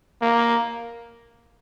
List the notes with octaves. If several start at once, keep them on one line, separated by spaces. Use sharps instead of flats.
A#3